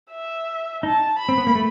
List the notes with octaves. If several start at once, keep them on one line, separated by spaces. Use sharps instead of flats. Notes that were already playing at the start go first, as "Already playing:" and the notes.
E5
D#4 A5
B5
C4
B3
A#3
A3